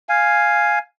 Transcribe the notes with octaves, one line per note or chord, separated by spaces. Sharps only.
F5 G#5